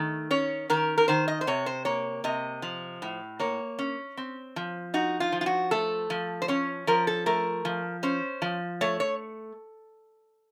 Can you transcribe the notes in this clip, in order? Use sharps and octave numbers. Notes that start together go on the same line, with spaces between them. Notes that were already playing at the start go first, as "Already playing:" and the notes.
Already playing: D#3 A3
C#4 C#5
D#3 A#4
A#4
D#3 C5
D#5
C5
C3 C#5
C5
A#3 C#5
C3 D#5
F3
A2
A#3 C#5
C#4
C4
F3
D#4 F#4
F4
F3
F4
F#4
A3 A4
F3
C5
C#4 C#5
F3 A#4
A4
A3 A#4
F3
C#4 C5
F3
A3 C#5
C#5